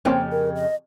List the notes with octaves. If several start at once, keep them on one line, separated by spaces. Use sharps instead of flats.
F2 C#3 A#3 C4 C#4 G4
A#4
D#5